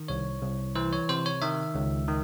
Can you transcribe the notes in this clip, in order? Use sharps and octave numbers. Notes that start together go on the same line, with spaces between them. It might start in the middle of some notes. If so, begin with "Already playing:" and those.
Already playing: D#3
C2 C#5
C2
E3 C5
C#5
C3 C5
C#5
D#3 E5
C#2
D#3